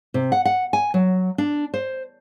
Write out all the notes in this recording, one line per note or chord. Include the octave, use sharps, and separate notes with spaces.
C3
F#5
F#5
G#5
F#3
D4
C5